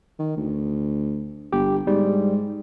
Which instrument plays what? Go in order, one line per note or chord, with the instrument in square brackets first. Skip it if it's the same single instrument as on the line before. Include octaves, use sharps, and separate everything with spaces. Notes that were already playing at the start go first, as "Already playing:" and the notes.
[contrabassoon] D#3
D2
[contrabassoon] G1 [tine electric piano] G4
[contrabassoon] G#2 [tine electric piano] G3